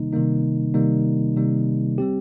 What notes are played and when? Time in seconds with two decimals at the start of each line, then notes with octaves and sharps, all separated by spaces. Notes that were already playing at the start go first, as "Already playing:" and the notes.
Already playing: C3 D#3 G3 A#3 D#4
0.13 C3 D#3 G3 A#3 D#4
0.74 C3 D#3 G3 A#3 D#4
1.36 C3 D#3 G3 A#3 D#4
1.98 G3 C4 G4